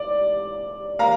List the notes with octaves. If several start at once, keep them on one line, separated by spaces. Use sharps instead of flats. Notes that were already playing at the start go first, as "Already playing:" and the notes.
Already playing: D5
A#3 F5 A#5